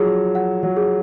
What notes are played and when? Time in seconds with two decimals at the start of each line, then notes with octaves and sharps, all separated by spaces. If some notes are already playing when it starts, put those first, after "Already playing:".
Already playing: F3 F#3 G#4
0.35 F#5
0.63 F#3
0.77 G#4